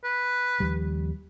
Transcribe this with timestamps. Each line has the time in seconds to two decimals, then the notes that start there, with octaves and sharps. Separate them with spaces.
0.04 B4
0.60 D#2 F3 G3